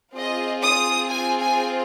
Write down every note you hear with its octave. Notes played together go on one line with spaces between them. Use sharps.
C4 F4 G#4 D#5
D#6
G#5
G#5